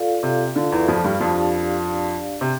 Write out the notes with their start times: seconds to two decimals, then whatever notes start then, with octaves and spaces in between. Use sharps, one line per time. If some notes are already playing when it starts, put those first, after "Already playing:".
Already playing: F4 A4 D5 F5
0.23 C3
0.55 D3 F4 A4 D5 F5
0.72 E2 E3
0.88 F2 F3
1.04 G2 G3
1.20 F2 F3 D4 G4 D5 F5
1.86 D4 G4 D5 F5
2.41 C3